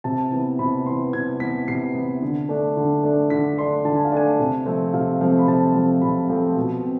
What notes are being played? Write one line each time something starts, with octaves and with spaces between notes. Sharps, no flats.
C3 A5
E3 B3
C3 B5
E3 B3 C6
C3 G#6
E3 B3 B6
C3 C7
E3 B3
D3
A3 D4
D3
A3 D4
D3 B6
A3 D4 C6
D3 A5
G#5
F5
A3 D4 G#5
C3
F3 A3 C4
C3 F5
F3 A3 C4 F5
B5
C3 A5
F3 A3 C4
C3 B5
F3 A3 C4
B2
C4